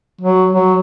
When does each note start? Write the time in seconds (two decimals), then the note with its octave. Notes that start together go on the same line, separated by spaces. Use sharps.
0.21 F#3
0.53 F#3